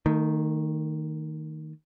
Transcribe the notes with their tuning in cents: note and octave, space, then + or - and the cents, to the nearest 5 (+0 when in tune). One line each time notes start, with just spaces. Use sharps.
D#3 +0 A3 +40